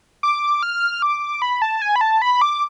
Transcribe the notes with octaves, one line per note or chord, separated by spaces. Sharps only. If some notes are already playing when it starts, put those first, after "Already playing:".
D6
F6
D6
B5
A5
G#5
B5
A5
B5
D6